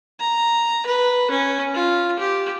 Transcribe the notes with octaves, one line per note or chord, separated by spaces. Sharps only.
A#5
B4
C#4
F4
G4